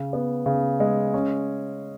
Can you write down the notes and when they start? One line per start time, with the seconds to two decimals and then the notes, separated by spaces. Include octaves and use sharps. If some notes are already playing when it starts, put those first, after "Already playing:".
Already playing: C#3
0.13 B3
0.46 C#3
0.80 G#3
1.14 C#4